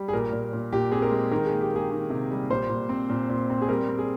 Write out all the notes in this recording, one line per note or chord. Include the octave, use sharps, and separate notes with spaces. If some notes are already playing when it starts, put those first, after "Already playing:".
Already playing: G3
G#4
A#2 A#4
A#2
A#2
A#2 G4
C4 G#4
A#4
G#3
D#3 A#4
A#3 G#4
G4
A#3 G#4
D#3
C3
G3
A#2 C5
A#2
C4
A#2
A#2
C4
G#4
G3 A#4
C4
G#4